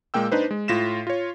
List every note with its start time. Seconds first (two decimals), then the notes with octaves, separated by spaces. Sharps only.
0.14 A#2 G#3 A#3 G5 E6
0.32 D4 D#4 B4 C5
0.51 G#3
0.68 A2 F4 A#6 B6 E7
1.07 F4 C#5